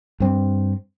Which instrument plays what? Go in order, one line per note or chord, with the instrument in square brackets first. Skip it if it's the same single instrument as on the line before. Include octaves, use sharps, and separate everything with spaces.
[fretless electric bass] G2 C4